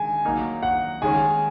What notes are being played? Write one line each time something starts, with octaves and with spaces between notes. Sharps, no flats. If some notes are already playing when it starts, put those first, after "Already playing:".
Already playing: D#3 G#3 G#5
F#3 A#3 D#4
F#5
D#3 G#3 C#4 G#5